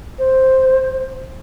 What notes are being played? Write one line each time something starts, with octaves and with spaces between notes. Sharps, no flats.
C5